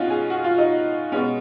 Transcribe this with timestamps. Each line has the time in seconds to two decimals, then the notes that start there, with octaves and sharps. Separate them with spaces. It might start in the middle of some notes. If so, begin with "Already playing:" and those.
Already playing: B2 B3 C#4 D#4 F4 F#4
0.10 G#4
0.30 F#4
0.44 F4
0.58 D#4
1.12 B2 G#3 B3 C#4